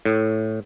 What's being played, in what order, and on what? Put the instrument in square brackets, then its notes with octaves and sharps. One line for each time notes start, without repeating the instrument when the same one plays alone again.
[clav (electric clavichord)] A2